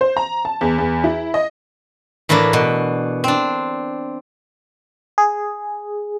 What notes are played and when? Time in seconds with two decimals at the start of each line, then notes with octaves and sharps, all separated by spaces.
0.01 C5
0.17 A#5
0.45 A5
0.61 E2
0.78 E2
1.04 E4
1.34 D#5
2.29 A2 E3 A#3 D4 E4
2.53 B2
3.24 C4 D4
5.18 G#4